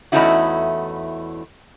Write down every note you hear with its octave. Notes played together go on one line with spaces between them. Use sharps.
E2 A3 C#4 D#4 E4 F#4